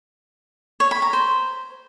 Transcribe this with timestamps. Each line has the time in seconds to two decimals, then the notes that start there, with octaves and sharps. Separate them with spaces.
0.80 C#5
0.91 B5
1.02 A#5
1.13 C5